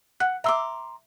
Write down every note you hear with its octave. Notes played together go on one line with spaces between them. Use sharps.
F#5 F#6
E5 A#5 C6 D6 E6